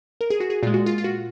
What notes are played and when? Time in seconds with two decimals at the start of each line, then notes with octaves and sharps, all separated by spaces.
0.21 A#4
0.30 G#4
0.40 F#4
0.50 G#4
0.63 A#2 G#3 F4
0.74 F#4
0.86 F4
0.98 F4
1.04 F#4